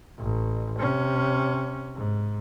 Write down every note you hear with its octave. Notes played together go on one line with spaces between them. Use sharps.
A1
C3 C#4
G#2